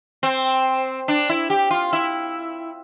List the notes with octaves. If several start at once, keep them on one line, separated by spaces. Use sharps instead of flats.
C4
D4
E4
G4
F4
E4